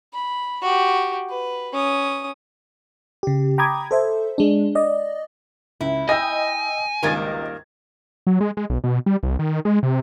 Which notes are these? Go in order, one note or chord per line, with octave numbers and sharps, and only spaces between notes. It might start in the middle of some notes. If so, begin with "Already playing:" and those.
B5
F#4 G4
B4
C#4 D#6
C#3 G4
G5 A#5 B5 D6 D#6 G#6
A4 C5 E5
G#3 D4
D5 D#5
C#2 E4
D#5 G5 G#5 E6 G6 A#6
G#1 C#2 D#3 G3 A#3 A#4 G#6 A6
F#3
G#3
G#3
B1
B2
G3
C2
D#3
G#3
C3